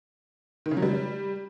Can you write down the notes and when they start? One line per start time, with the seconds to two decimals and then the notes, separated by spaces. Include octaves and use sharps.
0.66 D#3
0.71 C#3
0.77 F#3
0.82 G3